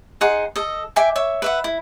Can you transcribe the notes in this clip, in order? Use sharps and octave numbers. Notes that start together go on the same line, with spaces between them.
D#4 G#4 F#5 C6
A4 D#5
E5 G5 G#5 D6
C#5 E5
B4 E5 F#5
E4